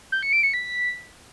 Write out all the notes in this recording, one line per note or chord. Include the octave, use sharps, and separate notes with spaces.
G6
C#7
D7
C#7
B6